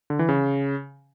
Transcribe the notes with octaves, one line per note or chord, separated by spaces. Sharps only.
D3
E3
C#3